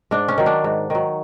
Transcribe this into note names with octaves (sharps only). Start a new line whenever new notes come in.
G#2 D4
C#4
D#3 F#3
D4
G#2
D#3 F#3